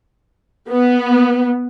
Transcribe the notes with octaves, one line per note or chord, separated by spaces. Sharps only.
B3